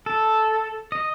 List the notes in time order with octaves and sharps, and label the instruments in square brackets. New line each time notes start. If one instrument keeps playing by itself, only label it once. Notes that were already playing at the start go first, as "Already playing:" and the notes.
[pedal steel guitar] A4
D#5